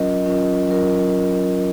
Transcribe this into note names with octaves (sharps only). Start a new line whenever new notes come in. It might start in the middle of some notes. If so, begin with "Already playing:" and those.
Already playing: F#3 C#4 F4 A#4 D#5
F#3 C#4 F4 A#4 D#5
F#3 C#4 F4 A#4